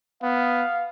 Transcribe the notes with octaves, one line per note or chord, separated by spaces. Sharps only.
B3 F5